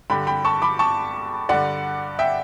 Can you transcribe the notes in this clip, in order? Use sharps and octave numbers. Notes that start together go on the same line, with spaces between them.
G2 D3 G5 B5
G5 B5
A5 C#6
B5 D6
A5 C#6
G2 D3 D5 F#5
E5 G5